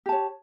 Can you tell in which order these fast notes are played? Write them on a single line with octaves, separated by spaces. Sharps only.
G4 A5 C#5